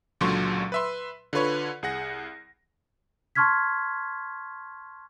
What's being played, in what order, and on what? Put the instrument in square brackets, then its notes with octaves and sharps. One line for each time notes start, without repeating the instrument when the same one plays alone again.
[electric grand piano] C#2 A#2 D3 F#3 C6 C#6
B4 E5 C6
D3 F4 B4 C#5
C2 G#4 F#5 A#6
[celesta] A5 C6 C#6 F6 G#6 B6